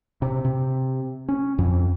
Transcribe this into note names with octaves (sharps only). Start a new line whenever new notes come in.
C3
C3
C#4
F2